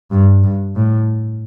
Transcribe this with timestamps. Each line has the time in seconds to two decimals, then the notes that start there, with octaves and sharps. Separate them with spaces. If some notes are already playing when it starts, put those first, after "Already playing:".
0.11 G2
0.43 G2
0.76 A2